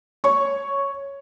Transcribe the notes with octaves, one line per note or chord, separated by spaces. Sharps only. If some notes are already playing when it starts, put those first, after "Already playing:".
C#5 C#6